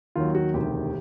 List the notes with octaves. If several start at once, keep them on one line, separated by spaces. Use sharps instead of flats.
D#2 D#3 F#3 F4
F#4
E1 D2 C3 D#3 G4